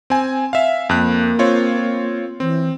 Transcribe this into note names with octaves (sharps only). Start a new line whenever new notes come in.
C4 G#5
E5 F5
F2 A#3 F#6
C4 F4 C#5
E3 C4